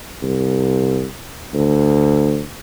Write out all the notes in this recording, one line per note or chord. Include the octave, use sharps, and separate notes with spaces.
C2
D2